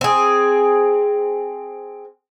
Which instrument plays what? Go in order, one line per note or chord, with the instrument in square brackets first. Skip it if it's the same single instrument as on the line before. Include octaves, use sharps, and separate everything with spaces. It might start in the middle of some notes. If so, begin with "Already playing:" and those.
[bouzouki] C4 G#4